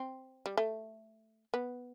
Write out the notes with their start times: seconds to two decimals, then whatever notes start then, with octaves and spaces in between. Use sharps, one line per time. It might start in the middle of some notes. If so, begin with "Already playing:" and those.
Already playing: C4
0.46 G3
0.57 A3
1.54 B3